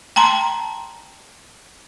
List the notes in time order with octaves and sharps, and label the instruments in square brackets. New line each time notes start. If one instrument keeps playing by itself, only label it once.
[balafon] G5 A5 A#5 C6